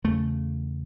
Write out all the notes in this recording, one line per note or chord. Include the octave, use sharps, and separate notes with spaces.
E2 C#3 A3